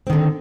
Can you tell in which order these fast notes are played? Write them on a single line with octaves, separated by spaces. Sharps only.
C4 D#3 D3